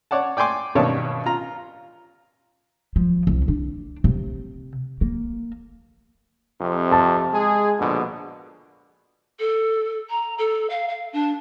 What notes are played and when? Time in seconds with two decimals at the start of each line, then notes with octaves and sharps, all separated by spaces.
0.11 C#5 D5 F#5 A5
0.37 D5 G5 G#5 C6 D6
0.75 G2 B2 D#3 D4 C#5 A5
1.26 F4 A#5
2.96 F3
3.27 C2
3.48 D4
4.04 C3
5.01 A#3
6.61 F2 C3
6.92 A5
7.32 G#3 G#4
7.79 A#1 B2 D3
9.39 A4
10.09 A#5
10.38 A4
10.69 F5
10.88 F5
11.12 D4